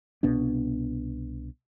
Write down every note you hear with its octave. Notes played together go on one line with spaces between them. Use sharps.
C2 B2 B3 D4